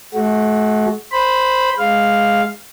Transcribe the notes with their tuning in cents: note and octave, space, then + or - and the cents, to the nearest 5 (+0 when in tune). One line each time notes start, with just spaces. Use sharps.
A3 -45 F#4 +0
C5 -5 B5 +0
G#3 +0 F5 +0